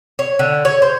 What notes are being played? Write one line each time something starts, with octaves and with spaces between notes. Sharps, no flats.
C#5
D3
C#5
C5